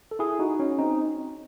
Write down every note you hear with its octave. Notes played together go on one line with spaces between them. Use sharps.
A4
E4 G#4
D#4 F#4
C#4
C4 D#4